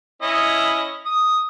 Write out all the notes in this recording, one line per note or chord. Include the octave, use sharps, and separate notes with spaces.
C#4 E4 D#5
D#6